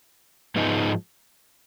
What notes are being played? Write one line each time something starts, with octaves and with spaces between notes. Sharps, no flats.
G#2 F3 G#3 B3 D#4